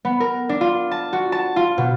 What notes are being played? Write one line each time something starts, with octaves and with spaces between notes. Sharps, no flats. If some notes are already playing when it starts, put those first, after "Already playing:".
B3
A#4
D4
F4
A5
F#4
A5
F4
B2